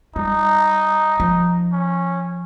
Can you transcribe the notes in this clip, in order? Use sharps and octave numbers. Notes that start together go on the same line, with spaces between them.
G3 D#4
F3
C#4